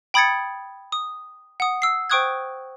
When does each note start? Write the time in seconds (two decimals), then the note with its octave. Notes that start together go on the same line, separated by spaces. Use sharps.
0.14 G5 B5 D#6 G#6 A6 C#7
0.92 D#6
1.60 F#5 D#6
1.82 E6 C7
2.10 C5 G5 C#6 D#6 F#6 G#6